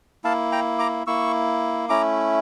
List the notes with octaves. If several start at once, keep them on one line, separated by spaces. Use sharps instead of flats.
A#3 E4 F5 A5
G5 A#5
A#5 D6
A#3 E4 C#6 E6
A3 C#4 E4 A#5 D6